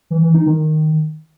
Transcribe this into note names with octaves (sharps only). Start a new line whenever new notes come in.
E3
E3
D#4
D#3